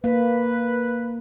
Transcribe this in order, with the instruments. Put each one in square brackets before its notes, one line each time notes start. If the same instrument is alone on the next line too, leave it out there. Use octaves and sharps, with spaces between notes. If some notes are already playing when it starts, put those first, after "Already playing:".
[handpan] A#3 [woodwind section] B4